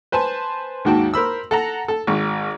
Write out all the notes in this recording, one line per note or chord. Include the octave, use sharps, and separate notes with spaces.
B4 C5 G#5 A5
D#2 G#2 F#4 G5 A5
A#4 C5 B5 E6
A4 F#5 A#5
A4
G#1 C#6